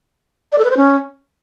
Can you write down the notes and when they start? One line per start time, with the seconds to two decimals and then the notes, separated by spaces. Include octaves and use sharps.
0.52 D5
0.58 A4
0.65 B4
0.71 C5
0.77 C#4